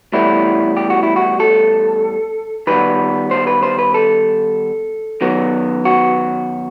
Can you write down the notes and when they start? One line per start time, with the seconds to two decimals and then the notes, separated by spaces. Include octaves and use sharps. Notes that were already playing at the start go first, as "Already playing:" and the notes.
0.12 A2 E3 G3 B3 E4
0.77 G4
0.90 F#4
1.03 E4
1.16 F#4
1.40 A4
2.67 D#3 G3 B3 B4
3.31 C5
3.47 B4
3.63 C5
3.79 B4
3.94 A4
5.21 D#3 F#3 B3
5.85 F#4